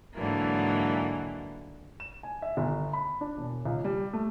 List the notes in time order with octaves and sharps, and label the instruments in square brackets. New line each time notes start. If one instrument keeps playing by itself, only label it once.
[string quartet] G#2 D3 E3 F#3 A#3
[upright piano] E7
G#5
E5
G1
B5
D4
E1
C#2
G3
A3